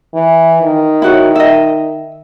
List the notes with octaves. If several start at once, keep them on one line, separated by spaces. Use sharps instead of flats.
E3
D#3
E4 F#4 C#5
D#5 E5